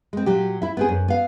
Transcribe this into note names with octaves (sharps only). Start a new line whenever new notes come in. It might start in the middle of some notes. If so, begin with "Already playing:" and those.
G#3 C4
A#2 F#3 G4
E4 E5
B3 C4 G#4
F#2
B3 F5